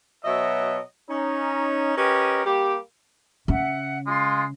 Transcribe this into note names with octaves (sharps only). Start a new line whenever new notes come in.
B2 F#3 D#5 E5
C#4 D#4
C#4 G4 A#4 B4 D#5
G3 A#3 G4
C#3 E5 F#5
G#3 F4 C6